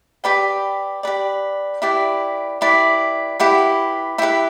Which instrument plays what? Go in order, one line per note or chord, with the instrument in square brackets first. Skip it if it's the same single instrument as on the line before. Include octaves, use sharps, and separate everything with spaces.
[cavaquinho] G4 B4 D5 G5 B5
G4 B4 D5
E4 G4 B4 D5
E4 G4 B4 D5
E4 G4 B4 F#5
E4 G4 B4 E5 G5